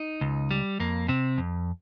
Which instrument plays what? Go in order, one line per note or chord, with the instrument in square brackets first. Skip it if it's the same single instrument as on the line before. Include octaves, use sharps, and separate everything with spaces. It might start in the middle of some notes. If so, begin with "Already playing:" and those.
Already playing: [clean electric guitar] D#4
C#2
G3
F2 A#3
C3 C4
F2